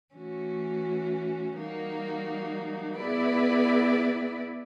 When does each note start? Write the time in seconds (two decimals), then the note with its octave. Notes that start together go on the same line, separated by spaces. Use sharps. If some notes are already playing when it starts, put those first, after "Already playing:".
0.13 E3 A3 C#4 F#4
1.56 E3 G3 A#3 D#4 F#4
2.98 B3 E4 G#4 B4 D5